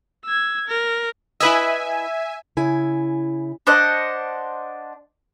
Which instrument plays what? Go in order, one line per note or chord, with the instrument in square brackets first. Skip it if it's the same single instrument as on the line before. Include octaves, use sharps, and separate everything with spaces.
[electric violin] E6 G#6
A#4
[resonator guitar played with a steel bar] E4 B4 D#5 [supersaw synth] E5 G#5
[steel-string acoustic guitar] C#3 E4 G#5
[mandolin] D4 C5 D#5 F#5